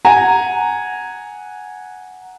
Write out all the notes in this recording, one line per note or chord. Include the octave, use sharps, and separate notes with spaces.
F#5 G#5 A#5